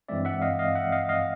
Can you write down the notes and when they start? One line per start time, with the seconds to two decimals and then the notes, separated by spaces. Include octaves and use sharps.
0.08 G2 E3 G#3 C4 D5 E5
0.25 E5 F#5
0.42 D#5 F5
0.59 D#5 F5
0.75 E5 F#5
0.92 D#5 F5
1.09 D#5 F5